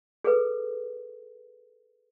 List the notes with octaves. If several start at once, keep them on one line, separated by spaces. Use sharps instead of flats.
G#4 A4 B4